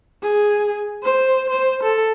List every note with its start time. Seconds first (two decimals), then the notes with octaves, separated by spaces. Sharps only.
0.22 G#4
1.03 C5
1.49 C5
1.83 A4